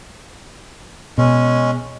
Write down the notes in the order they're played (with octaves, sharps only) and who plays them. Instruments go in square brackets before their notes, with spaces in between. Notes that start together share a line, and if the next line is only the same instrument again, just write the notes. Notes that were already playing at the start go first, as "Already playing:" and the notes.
[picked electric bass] B2 [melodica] G#3 C#4